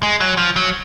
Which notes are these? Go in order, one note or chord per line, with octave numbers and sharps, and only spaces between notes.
G#3
F#3
F3
F#3